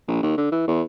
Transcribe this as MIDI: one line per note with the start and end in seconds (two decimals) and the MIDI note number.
0.08 0.18 34
0.22 0.37 39
0.37 0.51 50
0.51 0.66 52
0.67 0.82 40